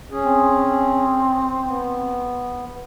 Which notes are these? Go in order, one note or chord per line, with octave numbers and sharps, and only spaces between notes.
C#4 G#4
C4
B3